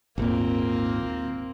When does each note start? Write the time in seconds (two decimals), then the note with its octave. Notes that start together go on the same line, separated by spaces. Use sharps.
0.18 G#1 D#2 A#2 A#3 C4